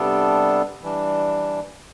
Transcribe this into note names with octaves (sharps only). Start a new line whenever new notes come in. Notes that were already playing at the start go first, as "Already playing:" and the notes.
Already playing: C3 G3 B3 D4 A4
E3 G3 D4